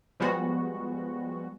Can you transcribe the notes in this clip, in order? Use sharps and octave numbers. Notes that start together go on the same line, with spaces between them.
F3 G3 G#3 B3 F#4